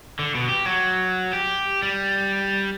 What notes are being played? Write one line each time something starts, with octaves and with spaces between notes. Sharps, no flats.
D3
B2
G4
F#3
G4
G3